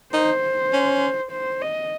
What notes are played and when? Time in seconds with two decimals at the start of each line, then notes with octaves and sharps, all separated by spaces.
0.13 D#4 C5
0.73 C#4
1.32 C5
1.62 D#5